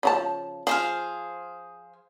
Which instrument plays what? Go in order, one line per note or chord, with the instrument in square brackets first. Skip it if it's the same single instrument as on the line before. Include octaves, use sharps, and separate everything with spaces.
[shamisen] C#3 F3 A5
[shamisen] F3 [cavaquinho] G#4 C5 F5